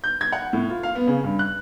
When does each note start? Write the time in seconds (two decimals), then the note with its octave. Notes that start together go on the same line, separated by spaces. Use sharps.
0.04 G6
0.21 G#6
0.32 F#5
0.53 A2
0.69 F4
0.83 F5
0.95 B3
1.07 C#3
1.24 G2
1.39 F#6